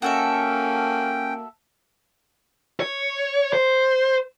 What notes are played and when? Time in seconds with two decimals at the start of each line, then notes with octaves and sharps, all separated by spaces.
0.02 A#3 C#4 F#4 A4 E5 G5
2.80 C#5
3.53 C5